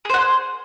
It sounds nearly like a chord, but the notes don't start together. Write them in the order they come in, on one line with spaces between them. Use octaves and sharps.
G#4 C5 F#5 C6